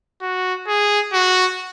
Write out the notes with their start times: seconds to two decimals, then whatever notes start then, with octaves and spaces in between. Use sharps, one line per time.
0.22 F#4
0.68 G#4
1.13 F#4